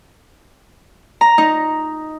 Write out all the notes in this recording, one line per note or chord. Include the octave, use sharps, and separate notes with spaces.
A#5
D#4